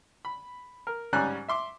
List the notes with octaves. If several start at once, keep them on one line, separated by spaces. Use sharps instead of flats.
B5
A#4
G#2 G3 C#4 G#5 A#5 F#6
E5 C6 D6